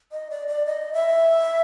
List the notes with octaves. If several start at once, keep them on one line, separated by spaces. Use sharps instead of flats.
D#5
D5
D5
D#5
E5